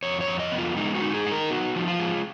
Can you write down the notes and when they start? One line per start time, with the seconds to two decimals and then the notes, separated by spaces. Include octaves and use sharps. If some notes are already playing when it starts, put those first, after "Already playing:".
0.03 F2 C#5
0.21 C#5
0.27 F2
0.40 D#5
0.52 B3
0.58 F4
0.76 G#3 D#4
0.95 F#4
1.01 D#4
1.14 G#4
1.26 D#4
1.32 A#4
1.51 B3 F#4
1.76 F3
1.88 F4
1.99 G#3